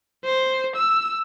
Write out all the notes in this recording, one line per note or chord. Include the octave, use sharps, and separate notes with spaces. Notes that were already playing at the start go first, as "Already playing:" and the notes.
C5
E6